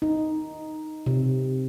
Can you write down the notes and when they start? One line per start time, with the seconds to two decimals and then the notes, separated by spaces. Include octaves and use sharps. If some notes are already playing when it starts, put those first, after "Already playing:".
0.02 D#4
1.06 C3